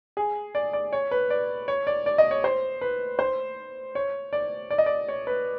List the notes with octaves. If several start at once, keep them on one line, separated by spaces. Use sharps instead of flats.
G#4
D5
D5
C#5
B4
D5
C#5
D5
D5
D#5
C#5
C5
B4
C5
C#5
D5
D5
D#5
D5
C#5
B4